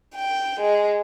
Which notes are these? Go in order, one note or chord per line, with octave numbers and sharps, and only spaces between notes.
G5
G#3